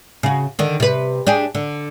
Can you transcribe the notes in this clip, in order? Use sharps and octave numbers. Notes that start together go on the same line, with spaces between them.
C#3 F#4
D3 D#3
C3 B4
D4 G4 G#4
D3